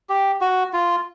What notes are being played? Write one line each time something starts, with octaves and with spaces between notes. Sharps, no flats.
G4
F#4
F4